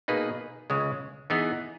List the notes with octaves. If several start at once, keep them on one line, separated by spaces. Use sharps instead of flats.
B2 A#3 D#4 G#4 B4
C#2 C#3 G#3
E3 B3 D#4 G#4